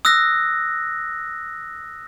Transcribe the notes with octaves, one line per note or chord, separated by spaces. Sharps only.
D#6 E6 F#6 A#6